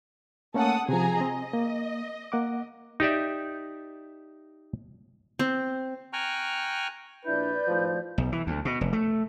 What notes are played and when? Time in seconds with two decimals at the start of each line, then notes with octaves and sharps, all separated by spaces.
0.54 A3 A#3 C#4 A4 F#5 D#6
0.89 C3 F3 G#4 G#5 A#5
1.21 C4 D#5
1.54 A#3
2.32 A#3 F#5 D6
3.00 D#4 G4 D5 E5
5.39 C4
6.13 G5 G#5 A#5 C#6 F6 F#6
7.25 A#1 D4 E4 B4 D5 G6
7.67 G#1 A2 F3
8.18 B1
8.32 E3
8.47 D2
8.65 B2
8.81 F1
8.93 A3